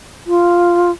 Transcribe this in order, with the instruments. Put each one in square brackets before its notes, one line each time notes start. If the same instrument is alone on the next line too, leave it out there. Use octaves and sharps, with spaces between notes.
[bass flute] F4